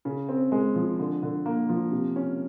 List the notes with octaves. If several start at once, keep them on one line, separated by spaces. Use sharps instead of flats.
C#3
C4
G#3
F3
D3
D3
A#3
F3
C3
C#4